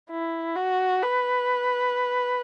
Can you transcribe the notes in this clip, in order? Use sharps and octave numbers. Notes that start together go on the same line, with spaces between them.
E4
F#4
B4